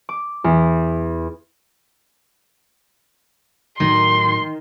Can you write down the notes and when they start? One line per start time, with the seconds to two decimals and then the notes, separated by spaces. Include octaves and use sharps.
0.09 D6
0.44 E2
3.80 A2 D#3 F#3 C6